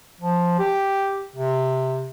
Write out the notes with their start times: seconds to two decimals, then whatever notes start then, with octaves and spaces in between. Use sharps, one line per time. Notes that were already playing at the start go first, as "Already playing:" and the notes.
0.21 F3
0.59 G4
1.36 C3